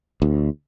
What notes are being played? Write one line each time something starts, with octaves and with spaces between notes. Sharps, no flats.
D2